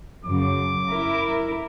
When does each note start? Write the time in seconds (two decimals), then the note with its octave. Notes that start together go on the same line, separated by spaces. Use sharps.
0.25 F#2 C#3 D6
0.90 E4 A#4